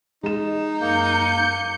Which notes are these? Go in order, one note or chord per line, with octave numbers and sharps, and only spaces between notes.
G#3 D#4 E7
F#2 A#3 G6 C#7